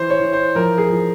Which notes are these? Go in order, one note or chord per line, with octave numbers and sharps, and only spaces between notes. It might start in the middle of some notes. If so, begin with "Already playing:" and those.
Already playing: E3 C5
C#5
E3
C5
F3 A#4
G#4
F3